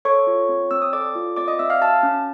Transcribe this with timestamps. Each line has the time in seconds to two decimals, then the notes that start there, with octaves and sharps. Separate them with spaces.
0.05 A4 C#5 C#6
0.27 F4
0.49 C4
0.71 C4 E6
0.82 D#6
0.93 A4 D5 D6
1.15 F4
1.36 C4 D5 D6
1.48 D#5 D#6
1.59 C4 E5 E6
1.70 F5 F6
1.81 F#4 A5 A6
2.03 C#4